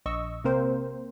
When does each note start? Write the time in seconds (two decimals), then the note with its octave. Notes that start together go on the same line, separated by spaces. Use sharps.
0.06 A#1 D#5 C#6 E6
0.44 C3 A#3 C4 A#4 C5